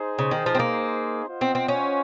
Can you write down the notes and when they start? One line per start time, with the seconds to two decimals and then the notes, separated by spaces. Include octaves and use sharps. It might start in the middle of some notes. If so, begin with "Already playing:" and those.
Already playing: D#4 G#4 C5
0.19 C#3
0.31 D#3
0.46 F3
0.55 C4
0.59 A#3
1.27 F4 C5 D#5 F#5
1.41 C4
1.55 C4
1.68 C#4